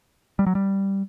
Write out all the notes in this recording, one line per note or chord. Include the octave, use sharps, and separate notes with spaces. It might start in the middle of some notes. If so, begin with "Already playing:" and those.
G3
F#3
G3